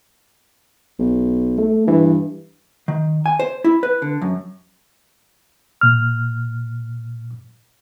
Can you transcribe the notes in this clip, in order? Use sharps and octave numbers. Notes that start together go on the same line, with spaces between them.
B1
A3
G2 E3
D#3
G#5
C5
E4
B4
D3
F#2
A#2 F6